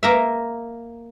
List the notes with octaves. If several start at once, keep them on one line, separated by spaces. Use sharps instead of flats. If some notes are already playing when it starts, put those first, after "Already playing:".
A#3 A#4 E5